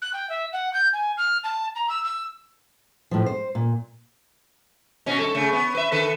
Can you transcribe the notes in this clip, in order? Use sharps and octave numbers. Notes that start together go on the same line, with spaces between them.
F#6
G5
E5
F#5
G6
G#5
F6
A5
A#5
E6
E6
A2 F3
C5
A#2
B2 C#4
G2 A4
C#3 A3
B3
B4 E5
D3 A4 B4